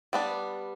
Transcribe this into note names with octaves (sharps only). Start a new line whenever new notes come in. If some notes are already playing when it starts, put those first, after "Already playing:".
G3 B3 D4